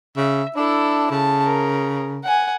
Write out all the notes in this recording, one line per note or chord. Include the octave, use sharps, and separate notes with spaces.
C#3 E5
D4 E4 A4
C#3 A5
A#4
F#5 G#5